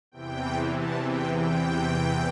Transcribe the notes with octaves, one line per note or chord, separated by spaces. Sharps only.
E2 C3 E3 G5
A5
G5
G5